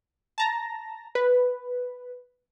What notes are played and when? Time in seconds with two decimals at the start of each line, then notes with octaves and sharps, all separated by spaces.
0.38 A5 A#5 A#6
1.15 B4